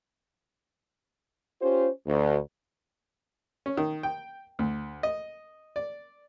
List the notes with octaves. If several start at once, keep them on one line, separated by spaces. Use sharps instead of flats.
C#4 F4 G4 C5
D2
C#4
D#3
G5
D2
D#5
D5